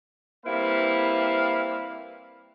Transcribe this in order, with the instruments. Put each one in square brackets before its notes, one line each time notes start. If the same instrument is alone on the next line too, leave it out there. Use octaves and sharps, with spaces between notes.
[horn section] G3 A#3 C4 E4 B4 F5